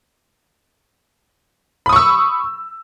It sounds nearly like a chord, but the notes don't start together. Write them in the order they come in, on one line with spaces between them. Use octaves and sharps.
B5 D#6 C#6 E6